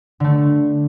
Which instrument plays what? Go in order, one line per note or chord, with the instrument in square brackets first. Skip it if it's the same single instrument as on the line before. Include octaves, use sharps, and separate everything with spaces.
[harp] D3 A3